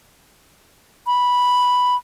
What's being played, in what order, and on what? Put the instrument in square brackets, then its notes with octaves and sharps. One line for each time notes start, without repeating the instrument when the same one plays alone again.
[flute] B5